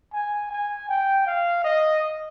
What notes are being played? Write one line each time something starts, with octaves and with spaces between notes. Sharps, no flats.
G#5
G#5
G5
F5
D#5